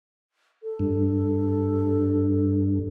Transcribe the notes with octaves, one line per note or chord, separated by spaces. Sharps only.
A4
G2